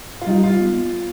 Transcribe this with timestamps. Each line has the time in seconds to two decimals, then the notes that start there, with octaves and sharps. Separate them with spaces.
0.22 F4
0.27 G3 D#4
0.43 F4
0.60 B3